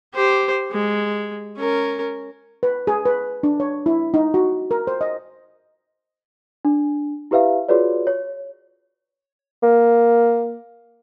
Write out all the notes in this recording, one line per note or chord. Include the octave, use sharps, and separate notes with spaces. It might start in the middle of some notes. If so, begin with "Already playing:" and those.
G4 C5
G#3
C#4 A#4
B4
G#4
B4
D4
C#5
E4
D#4
F#4
A#4
C5
D#5
D4
E4 G4 B4 E5 F5
F4 F#4 G#4 B4 C#5 D5
C#5
A#3